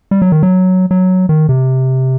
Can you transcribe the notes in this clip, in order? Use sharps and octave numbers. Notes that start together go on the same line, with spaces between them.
G3
F#3
D#3
F#3
F#3
D#3
C3